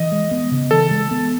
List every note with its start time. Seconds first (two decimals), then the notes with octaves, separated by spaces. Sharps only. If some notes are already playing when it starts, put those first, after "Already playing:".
Already playing: E3 D#5
0.12 G#3
0.31 B3
0.52 C#3
0.71 E3 A4
0.91 G#3
1.11 B3